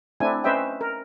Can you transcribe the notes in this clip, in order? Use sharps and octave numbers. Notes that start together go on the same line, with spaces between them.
A3 C4 D4 E4 G#5
C#4 B4 C5 D#5 E5 G5
A#4